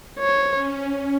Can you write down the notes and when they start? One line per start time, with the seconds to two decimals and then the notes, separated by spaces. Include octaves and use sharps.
0.19 C5 C#5
0.50 C#4
0.79 C#4